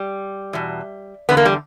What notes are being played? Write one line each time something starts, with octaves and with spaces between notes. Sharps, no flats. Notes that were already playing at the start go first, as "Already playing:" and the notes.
Already playing: G3
E2 B2
E2 D3 B3
A#3
G3